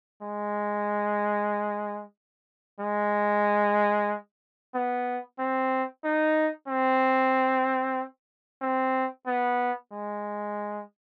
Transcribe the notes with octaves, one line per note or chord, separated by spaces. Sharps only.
G#3
G#3
B3
C4
D#4
C4
C4
B3
G#3